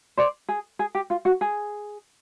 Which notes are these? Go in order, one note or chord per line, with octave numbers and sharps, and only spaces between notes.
C5 D5
G#4
G#4
G4
F4
F#4
G#4